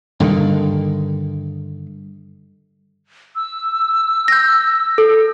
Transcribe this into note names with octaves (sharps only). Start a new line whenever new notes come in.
G2 D3 D#3
E6
G6 A#6
A4